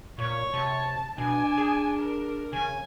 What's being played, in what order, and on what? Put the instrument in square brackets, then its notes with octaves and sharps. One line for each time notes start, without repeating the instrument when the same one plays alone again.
[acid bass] A#2 [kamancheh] C#5
[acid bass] C3 [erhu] A5
[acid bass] B2 [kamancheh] D4 [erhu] G#5
[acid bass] G#4
[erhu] A#4
[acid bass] C#3 [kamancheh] G#5